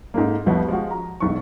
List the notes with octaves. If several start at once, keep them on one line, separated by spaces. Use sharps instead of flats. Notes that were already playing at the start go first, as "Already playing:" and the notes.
G#2 A3 A#3
C2 F2 F3 B3 F#4
F3 G#3 F4 F#4
A#5
E1 B1 C#6